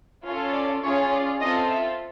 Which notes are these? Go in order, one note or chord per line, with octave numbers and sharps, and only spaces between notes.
C#4 F4 A4
D5
C#4 F4 G#4 C#5
D5
C4 F4 A4 D#5
E5